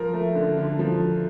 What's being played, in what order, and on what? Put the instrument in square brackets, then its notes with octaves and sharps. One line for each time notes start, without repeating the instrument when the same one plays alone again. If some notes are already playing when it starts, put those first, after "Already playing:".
Already playing: [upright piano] F3 A#4
A3
D3
D3
F3